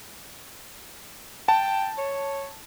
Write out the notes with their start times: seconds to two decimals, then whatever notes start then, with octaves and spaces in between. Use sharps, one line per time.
1.48 G5 A5
1.98 C#5